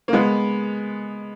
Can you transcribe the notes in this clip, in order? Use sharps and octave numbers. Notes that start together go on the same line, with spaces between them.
A#3
G#3 B3